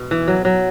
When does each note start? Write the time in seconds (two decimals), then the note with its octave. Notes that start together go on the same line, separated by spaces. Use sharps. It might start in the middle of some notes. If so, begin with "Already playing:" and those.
Already playing: B2
0.11 E3
0.28 F#3
0.45 F#3